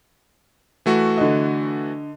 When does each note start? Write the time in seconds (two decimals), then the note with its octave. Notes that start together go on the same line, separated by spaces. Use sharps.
0.86 E3 A3 F#4
1.17 D3 D#5